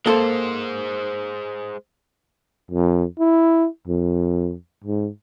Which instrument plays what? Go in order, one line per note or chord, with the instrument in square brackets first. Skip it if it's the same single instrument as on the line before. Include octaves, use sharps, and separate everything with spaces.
[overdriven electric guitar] G#3 C5 [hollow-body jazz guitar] A#3 A4
[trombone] F2
E4
F2
G#2